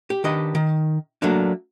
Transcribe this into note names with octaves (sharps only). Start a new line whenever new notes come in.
G4
D#3 D4 G4 B4 D#5
D#3
F#3 A3 A#3 D4